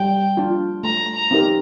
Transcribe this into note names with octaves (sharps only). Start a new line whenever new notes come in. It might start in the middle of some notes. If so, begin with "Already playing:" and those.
Already playing: G3 G5
D4 F4
A3 A#5
A#5
C4 D#4 G4 A#4